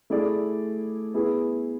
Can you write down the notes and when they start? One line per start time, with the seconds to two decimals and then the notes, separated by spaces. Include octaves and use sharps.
0.10 A3 E4 G#4 D5
1.14 B3 E4 G#4